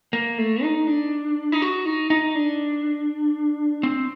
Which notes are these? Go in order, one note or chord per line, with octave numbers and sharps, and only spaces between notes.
A#3
A3
D#4
D4
D#4
F#4
D#4
D#4
D4
C4